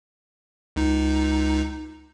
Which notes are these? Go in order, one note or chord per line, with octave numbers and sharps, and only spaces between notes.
C#2 D#4